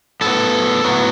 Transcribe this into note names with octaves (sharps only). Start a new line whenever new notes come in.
A2 F#3 B3 A4
A2 F#3 B3